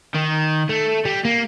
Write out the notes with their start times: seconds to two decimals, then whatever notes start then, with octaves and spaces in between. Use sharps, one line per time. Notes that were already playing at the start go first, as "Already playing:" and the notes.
0.14 D#3
0.69 A3
1.05 G3
1.25 A#3